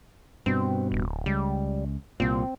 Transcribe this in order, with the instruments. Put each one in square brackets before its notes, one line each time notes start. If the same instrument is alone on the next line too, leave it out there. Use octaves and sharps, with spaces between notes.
[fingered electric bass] G2 B2 [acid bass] C4
[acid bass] D1
[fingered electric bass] C#2 [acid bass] G3
[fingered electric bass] C2 A#2 [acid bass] C4